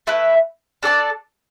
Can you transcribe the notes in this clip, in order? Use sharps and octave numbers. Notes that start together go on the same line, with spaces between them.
A3 E4 B4
D4 A4 D5 A5